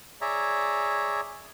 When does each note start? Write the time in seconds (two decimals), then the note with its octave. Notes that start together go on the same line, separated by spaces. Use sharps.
0.21 G#4 C#5 D5 E5 A#5